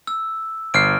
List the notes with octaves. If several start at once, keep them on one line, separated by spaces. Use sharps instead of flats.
E6
G1 F6 C7 D7